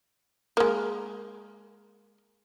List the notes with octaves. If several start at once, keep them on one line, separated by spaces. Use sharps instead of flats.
G#3 A#3